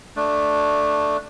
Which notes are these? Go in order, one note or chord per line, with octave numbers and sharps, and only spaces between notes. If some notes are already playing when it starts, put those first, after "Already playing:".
A3 D4